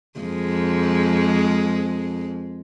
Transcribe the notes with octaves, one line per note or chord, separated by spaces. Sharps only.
F2 G#3